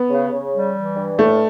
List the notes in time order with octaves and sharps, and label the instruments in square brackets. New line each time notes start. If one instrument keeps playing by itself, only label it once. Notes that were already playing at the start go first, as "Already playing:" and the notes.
Already playing: [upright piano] B3
[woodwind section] C#3
C#3
G3
E3
G2
[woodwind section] A2 [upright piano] A3